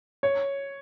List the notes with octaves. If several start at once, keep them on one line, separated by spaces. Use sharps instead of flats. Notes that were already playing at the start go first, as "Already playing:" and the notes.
C#5